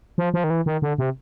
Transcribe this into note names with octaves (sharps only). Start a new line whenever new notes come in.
F3
F3
D#3
E3
D#3
D3
C3